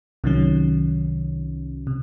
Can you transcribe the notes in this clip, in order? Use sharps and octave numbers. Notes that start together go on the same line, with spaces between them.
C2 C3 D#3 F#3 C#4
C3